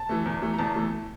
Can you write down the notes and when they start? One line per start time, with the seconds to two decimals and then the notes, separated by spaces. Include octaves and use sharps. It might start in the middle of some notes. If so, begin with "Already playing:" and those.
Already playing: A5
0.09 E3 A3
0.26 E2
0.42 E3 A3
0.53 A#5
0.58 E2 A5
0.75 E3 A3